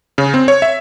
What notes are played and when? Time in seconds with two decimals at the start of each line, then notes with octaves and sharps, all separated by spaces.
0.18 C#3
0.34 C4
0.48 C#5
0.62 E5